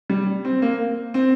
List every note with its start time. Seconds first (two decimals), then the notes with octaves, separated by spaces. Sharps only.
0.10 G3
0.45 C4
0.62 A#3
1.14 C4